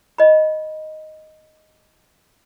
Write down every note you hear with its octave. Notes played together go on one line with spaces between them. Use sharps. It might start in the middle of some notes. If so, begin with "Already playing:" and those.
D#5 B5